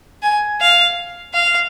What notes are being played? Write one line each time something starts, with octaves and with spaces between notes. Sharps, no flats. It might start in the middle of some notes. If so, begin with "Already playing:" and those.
G#5
F5
F5